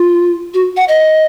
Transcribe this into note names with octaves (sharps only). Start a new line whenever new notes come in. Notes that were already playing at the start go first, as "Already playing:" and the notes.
Already playing: F4
F#4
F#5
D#5